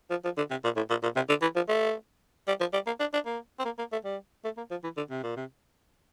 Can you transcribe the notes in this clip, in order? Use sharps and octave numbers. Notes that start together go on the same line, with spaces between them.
F3
F3
D3
C3
A#2
A2
A#2
A#2
C3
D3
E3
F3
A3
G3
F3
G3
A#3
D4
D4
A#3
C4
A#3
A#3
A3
G3
A3
A#3
F3
E3
D3
C3
A#2
C3